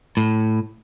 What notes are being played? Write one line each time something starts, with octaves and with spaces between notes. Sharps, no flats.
A2